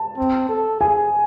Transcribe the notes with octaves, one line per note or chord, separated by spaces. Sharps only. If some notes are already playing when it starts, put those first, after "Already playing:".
Already playing: A5
C4
A4
G#4 G#5